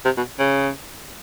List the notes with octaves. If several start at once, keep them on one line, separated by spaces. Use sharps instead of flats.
C3
B2
C#3